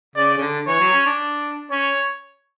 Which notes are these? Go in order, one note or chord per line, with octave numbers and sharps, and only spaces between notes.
C#3 D5
C#3
D3
E3 C#5
F#3
C#4
D4
C#4 C#5